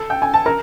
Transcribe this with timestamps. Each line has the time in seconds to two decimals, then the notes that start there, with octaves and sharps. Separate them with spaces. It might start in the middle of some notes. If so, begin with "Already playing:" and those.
Already playing: A4
0.10 G5
0.22 G#5
0.34 A5
0.46 A#4 A#5